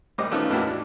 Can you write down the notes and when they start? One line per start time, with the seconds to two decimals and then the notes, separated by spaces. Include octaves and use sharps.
0.18 A#1 G3 C5 D#5 D6
0.31 D#3 A3 B3 C#4 D#4 F4
0.49 E2 A2 A#3 E4 F#4 G4
0.68 D4